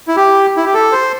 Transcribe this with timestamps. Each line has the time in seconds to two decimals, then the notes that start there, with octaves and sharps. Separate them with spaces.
0.08 E4
0.16 G4
0.57 E4
0.66 G4
0.74 A4
0.92 C5